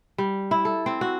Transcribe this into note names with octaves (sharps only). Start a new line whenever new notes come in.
G3
E4
A4
C4
F#4